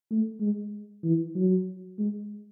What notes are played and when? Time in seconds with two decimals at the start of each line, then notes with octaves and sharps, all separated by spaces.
0.11 A3
0.41 G#3
1.04 E3
1.36 F#3
1.99 G#3